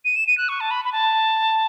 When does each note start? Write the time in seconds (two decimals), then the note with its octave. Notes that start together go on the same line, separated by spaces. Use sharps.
0.05 D#7
0.16 E7
0.27 D#7
0.38 F#6
0.49 C#6
0.60 A5
0.71 B5
0.85 B5
0.92 A5